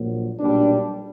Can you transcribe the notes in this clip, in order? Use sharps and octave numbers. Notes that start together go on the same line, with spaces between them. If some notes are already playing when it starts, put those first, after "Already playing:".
Already playing: A#1 A#2 F#3
B1 A#2 G3 D4